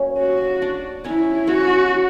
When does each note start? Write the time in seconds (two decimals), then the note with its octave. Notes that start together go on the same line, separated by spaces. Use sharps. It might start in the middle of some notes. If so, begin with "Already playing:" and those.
Already playing: F#3 A#3 C#4 C#5
0.19 F#4
0.62 D4 D5
1.04 C#4 E4 C#5
1.47 C#4 F#4 C#5